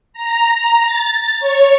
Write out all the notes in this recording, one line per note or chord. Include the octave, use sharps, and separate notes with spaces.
A#5
A#5
A6
C#5